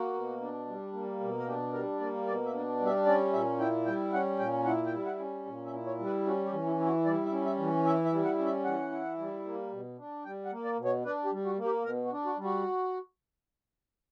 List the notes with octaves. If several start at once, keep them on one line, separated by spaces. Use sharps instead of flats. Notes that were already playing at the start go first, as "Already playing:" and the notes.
Already playing: A#3 F#4
B2
D4
G3
A#3
B2
A#4
D4 G4
G3 A#4
A#3 D5
B2 D5
E5
D4
G3
E5
C#4 D5
A#2 E5
E4 G5
G3 G5
C#4 F#5
A#2 G5
E4 F#5
G5
G3
F#5
C#4
A#2
E5
E4
C#5
G3
B4
C#4 F#4
G4
E3
E4
E4
F#4
G3 D5
E5
C#4
E5
E3
E4 E5
E5
G3
F#5
C#4
E5
E3 F#5
E4
G3
A#3
B2
D4
G3 G5
F#5
A#3
D5
B2
C#5
D4 B4
G4
G3
F#4
A#3
G4
B2 A#4
F#4
D4
F#4
G3
F#4